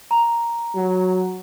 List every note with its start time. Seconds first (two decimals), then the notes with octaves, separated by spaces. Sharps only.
0.11 A#5
0.76 F#3